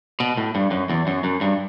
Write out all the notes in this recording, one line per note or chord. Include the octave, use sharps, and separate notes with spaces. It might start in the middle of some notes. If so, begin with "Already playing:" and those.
B2
A2
G2
F#2
E2
F#2
F#2
G2